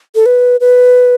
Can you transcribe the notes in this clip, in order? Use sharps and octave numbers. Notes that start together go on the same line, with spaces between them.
A4
B4
B4